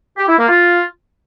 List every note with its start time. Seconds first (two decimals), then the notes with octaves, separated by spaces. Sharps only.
0.17 G4
0.27 E4
0.38 A#3
0.48 F4